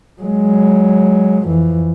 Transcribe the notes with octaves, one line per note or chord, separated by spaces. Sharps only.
F#3 G#3
F2 E3